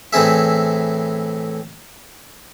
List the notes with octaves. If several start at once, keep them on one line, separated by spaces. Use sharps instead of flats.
A2 E3 C4 G#4 E5